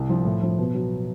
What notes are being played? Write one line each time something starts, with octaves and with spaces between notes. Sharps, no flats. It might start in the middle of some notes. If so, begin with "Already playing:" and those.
Already playing: C2
F3
A2
F3
B2
F#3